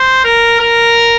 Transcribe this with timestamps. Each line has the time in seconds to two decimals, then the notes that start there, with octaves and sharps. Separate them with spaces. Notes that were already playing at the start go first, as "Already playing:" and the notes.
Already playing: C5
0.24 A#4
0.60 A#4